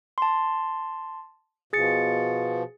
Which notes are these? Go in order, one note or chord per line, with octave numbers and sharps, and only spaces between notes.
A5 C6
B2 F3 G#4 A6 C#7